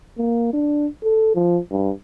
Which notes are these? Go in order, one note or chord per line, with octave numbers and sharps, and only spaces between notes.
A#3
D4
A4
F3
G2